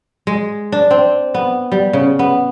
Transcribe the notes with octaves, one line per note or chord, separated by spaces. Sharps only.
G#3
D4
C4
B3
G3
C#3
B3